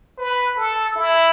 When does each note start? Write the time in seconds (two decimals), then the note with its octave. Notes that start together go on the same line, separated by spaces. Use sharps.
0.18 B4
0.56 A4
0.96 E4